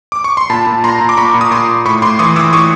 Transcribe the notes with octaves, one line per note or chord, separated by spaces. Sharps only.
D6
C#6
C6
A#2 A5 B5
A#2
A#2 A#5 C6
A#2
D6
A#2 B5 C#6
A#2
D#6
A#2 C6 D6
A#2
A2 B5 C#6
A2 C6 D6
E3 C#6 D#6
E3 D6 E6
A2 C#6 D#6